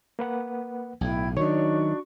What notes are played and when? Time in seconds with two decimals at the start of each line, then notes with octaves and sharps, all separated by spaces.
0.19 A#3 B4 F#5
1.01 B1 A2 E4 G5 G#6
1.37 D#3 F#3 D4 D#4 F#4 C#5 C#6